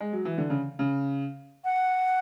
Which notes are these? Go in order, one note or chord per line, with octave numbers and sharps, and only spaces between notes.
G#3
F#3
E3
D3
C#3
C#3
F#5